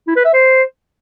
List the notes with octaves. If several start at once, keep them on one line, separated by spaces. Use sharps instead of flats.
E4
B4
E5
C5